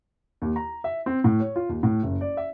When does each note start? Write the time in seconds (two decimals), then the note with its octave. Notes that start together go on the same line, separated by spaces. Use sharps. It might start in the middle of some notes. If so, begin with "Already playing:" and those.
0.42 D#2
0.56 A#5
0.84 E5
1.06 C4
1.24 A2
1.40 C#5
1.56 F4
1.69 D#2
1.83 A2
2.03 F#1
2.21 D5
2.37 E5